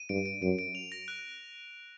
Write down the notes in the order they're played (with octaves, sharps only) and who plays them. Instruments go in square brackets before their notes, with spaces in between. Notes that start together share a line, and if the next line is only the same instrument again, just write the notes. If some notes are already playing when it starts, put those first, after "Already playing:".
Already playing: [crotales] D#7
[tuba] G2 [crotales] D7
[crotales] D7
[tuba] F#2 [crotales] D7
[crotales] D7
F7
A#6
F#6